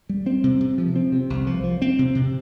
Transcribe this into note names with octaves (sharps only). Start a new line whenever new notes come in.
G3
C4
C3
C3
F3
C4
C3
C2
F3
F3
C4
C3
C3